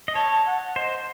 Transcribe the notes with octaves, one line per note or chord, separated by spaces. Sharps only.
D#5
C#5 A5
F#5
C5 D#5